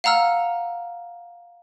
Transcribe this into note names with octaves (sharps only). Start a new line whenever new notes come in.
F5 F#5 A#5 E6 F6